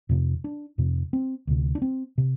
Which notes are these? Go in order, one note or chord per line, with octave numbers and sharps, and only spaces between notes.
F2 C3
D4
F2 C3
C4
D2 C3
D4
C4
C3